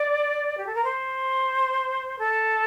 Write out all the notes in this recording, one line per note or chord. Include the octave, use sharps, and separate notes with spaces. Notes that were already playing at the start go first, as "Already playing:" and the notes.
Already playing: D5
G4
A4
A#4
C5
A4